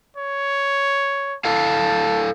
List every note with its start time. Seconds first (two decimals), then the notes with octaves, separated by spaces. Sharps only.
0.17 C#5
1.45 E4 A4 F5 A5